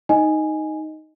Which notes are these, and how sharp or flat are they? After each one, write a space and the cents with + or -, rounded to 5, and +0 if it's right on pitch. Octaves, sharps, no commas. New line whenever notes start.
D#4 +0 D#5 +0 G#5 +0